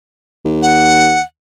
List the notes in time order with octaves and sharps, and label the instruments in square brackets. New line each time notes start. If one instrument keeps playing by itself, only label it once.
[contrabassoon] D#2
[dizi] F#5